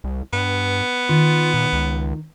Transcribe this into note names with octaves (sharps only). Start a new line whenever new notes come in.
C2
G2 B3
D#3 F4
A#2
C#2